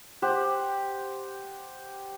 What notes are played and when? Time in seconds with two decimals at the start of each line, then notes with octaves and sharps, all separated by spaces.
0.22 G4 C5 F#5